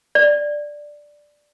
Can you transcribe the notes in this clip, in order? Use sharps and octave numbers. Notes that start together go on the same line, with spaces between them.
D5